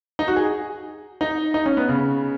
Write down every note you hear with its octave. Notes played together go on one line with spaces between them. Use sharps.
D#4
F#4
G#4
D#4
D#4
C#4
B3
C#3